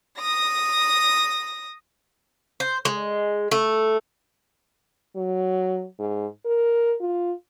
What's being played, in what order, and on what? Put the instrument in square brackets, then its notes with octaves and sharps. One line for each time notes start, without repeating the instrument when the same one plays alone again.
[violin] D#6 A#6
[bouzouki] C5
G#3
A3
[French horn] F#3
G#2
A#4
F4